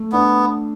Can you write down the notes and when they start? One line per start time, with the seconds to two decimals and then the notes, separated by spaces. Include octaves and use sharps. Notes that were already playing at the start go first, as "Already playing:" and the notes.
Already playing: A3
0.13 B3 D4